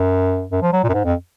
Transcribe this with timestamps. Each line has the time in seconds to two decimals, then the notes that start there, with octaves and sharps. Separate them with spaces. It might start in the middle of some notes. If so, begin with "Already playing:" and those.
Already playing: F#2
0.52 F#2
0.62 F3
0.73 F#3
0.84 A#2
0.89 F#2
0.94 G#2
1.04 F2